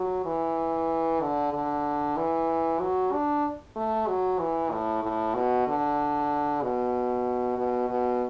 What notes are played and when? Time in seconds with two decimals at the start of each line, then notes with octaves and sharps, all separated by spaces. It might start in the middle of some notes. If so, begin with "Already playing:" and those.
Already playing: F#3
0.25 E3
1.22 D3
1.53 D3
2.17 E3
2.80 F#3
3.12 D4
3.76 A3
4.07 F#3
4.39 E3
4.71 A2
5.03 A2
5.35 B2
5.67 D3
6.62 B2
7.58 B2
7.90 B2